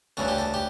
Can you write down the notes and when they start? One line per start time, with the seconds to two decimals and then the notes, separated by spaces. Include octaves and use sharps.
0.17 D2 C#3 E3 A4
0.28 G4
0.38 A4
0.54 G4